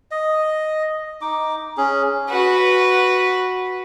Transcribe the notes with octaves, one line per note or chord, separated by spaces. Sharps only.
D#5
D#4 D6
C#4 G#4
F#4 B4